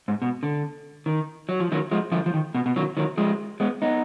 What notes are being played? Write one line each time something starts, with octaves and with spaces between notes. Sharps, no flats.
G#2
B2
D3
D#3
F#3
F3
D#3 F#3
F3 G#3
D3 F3
F3
D#3
B2
B2
D#3 F#3
D#3 F#3
F3 G#3
G#3 B3
B3 D#4